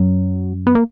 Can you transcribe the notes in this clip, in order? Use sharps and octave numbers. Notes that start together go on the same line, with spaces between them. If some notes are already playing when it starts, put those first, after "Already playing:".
Already playing: F#2 F#3
B3
A#3